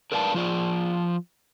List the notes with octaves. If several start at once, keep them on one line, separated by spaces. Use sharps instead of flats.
A#4 B4 D5 F5 G#5 A5
F3 F4 D5